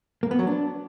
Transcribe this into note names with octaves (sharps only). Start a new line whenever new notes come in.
A#3
B3
F#3
D4